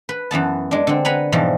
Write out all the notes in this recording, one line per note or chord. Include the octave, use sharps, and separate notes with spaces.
B4
F#2 E3 B3 A5
G#3 D4
D3 C4
B4 F#5 G#5 A#5 B5
G#2 B2 E3 F3 G3